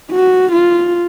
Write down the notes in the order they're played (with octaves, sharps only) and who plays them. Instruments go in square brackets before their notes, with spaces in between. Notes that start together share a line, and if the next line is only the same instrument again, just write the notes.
[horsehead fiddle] F#4
F4